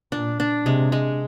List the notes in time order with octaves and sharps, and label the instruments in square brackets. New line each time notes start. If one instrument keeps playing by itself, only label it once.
[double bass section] A#2 [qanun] D4
[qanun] D4
[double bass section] C3 [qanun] G#3
[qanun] G#3